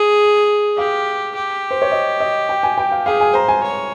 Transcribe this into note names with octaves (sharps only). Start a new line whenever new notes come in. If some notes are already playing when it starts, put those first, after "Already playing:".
Already playing: G#4
G4 F5
G4
C5
C#5
D#5
D#5
G5
G#5
G5
F5
G#4 F5
G#5
C5 A#5
G#5
C#5